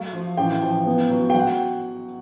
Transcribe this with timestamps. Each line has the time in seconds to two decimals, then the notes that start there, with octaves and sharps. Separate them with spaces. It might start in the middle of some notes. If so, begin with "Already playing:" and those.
Already playing: F#3 A3 F5
0.13 F3
0.37 A1 G5
0.62 F3
0.86 B3
1.10 F#3
1.30 G5
1.34 F#3 F#5